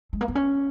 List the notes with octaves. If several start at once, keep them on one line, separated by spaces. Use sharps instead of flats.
G#3
A#3
B3
C#4